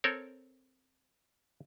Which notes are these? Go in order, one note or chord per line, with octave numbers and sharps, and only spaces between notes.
C4 A4 A#4 C#5